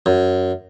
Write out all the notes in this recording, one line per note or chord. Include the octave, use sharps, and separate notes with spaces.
F#2